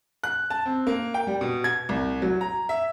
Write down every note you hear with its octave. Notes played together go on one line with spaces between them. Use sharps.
F#6
A5
C4
A#3
G5
G3
B2
G#6
C2
F#3
A#5
E5